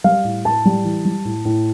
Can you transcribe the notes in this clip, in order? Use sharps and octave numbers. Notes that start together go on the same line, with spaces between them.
G3 F5
A2
A2 A5
G3
E3
G3
A2
A2